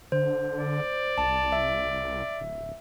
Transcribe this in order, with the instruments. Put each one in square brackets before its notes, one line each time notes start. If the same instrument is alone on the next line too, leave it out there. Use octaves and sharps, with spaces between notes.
[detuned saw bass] D3 [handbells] C5
[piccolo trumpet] D5
[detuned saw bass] C2 [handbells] A5
[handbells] E5
[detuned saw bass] D1